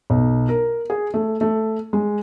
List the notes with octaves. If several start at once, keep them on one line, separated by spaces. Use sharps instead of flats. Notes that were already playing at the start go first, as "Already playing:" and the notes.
B1
A#4
G#4
A3
A3
G#3